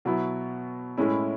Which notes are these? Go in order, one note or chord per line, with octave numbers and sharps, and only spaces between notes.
B2 F#3 B3 E4
A2 G#3 C#4 E4